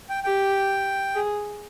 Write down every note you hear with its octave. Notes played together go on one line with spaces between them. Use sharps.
G5
G4 G5
G#4